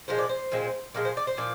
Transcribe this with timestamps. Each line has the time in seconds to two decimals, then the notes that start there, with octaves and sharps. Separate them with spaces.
0.08 A#2 F3 G#3 C5
0.18 D5
0.29 C5
0.52 A#2 F3 G#3 C4
0.95 A#2 F3 G#3 A#4
1.05 C5
1.17 D5
1.27 C5
1.37 A#2 F3 D5